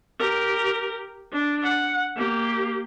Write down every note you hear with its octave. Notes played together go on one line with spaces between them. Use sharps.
G4 A#4
D4
F#5
A#3 G4